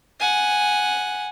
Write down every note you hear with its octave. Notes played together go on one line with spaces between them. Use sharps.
F#5 G#5